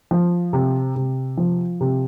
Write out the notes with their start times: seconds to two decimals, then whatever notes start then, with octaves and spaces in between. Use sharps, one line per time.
0.11 F3
0.53 C3
0.96 C3
1.37 F3
1.80 C3